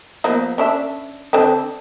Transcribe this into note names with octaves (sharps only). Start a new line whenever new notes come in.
F3 A#3 B3
C#4 D4 E5
D3 C4 D4